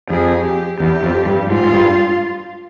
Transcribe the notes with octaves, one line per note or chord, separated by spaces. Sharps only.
F2 G#4
G4
E2 G4
F2
G2
G#2 F4
G#2
G2